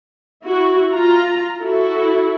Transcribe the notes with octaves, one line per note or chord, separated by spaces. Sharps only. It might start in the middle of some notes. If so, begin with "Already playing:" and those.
E4 F#4
F4 A#5
E4 F#4 A4